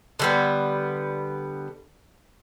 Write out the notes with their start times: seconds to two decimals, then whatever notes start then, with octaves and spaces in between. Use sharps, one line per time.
0.19 D3 G3 B3